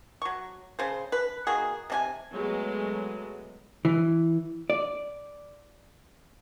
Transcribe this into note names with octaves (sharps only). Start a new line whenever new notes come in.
F#3 C#6
C#3 C5
B4
D#3 A#3 F#4 G#4
C3 D4 G#5
F#3 G#3 A3 B3
E3
D5